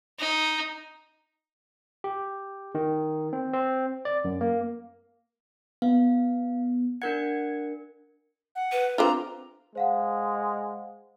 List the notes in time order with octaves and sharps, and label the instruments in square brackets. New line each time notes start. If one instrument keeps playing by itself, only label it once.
[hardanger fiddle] D#4
[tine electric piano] G4
D#3
C4
C4
D5
F#2
A#3
[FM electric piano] B3 [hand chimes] F5
[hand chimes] D4 A#4 C#7 [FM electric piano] F#5 G#6
[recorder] F#5
[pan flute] B4
[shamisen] C4 D4 F4 [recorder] A#5
[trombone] G#3 [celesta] C5 F5 F#5